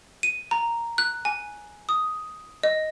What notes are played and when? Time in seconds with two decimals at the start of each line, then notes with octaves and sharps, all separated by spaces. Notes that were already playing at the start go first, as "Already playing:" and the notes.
0.23 D#7
0.51 A#5
0.98 F#6
1.25 G#5
1.89 D#6
2.63 D#5